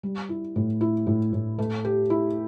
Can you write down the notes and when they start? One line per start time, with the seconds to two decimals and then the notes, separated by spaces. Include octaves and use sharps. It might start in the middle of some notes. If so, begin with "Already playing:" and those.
0.03 G3
0.29 E4
0.56 A2
0.81 E4
1.07 A2
1.33 A2
1.59 A3
1.85 G4
2.10 E4